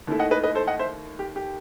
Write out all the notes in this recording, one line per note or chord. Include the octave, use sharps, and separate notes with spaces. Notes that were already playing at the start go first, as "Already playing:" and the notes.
D#2 D#3 A3 E4
D#5 F#5
B4 D#5
B4 D#5
A4 C5
D#5 F#5
C5 E5
G4
G4